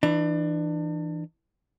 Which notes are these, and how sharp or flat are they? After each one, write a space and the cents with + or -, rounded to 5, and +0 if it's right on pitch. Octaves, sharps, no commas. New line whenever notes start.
E3 +0 D4 +30